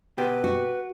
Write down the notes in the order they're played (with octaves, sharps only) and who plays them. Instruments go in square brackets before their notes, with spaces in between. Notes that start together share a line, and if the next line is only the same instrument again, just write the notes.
[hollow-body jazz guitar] B2 G4 [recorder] B4
[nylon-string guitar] F#4